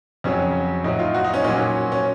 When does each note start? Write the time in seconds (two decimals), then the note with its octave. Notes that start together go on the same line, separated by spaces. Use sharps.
0.24 F2 C#3 F#3 C#4
0.84 A2 F#3 D#4
0.99 F4
1.14 F#4
1.24 D#4
1.34 C#4
1.44 A#2 F#3 C#4
1.92 C#4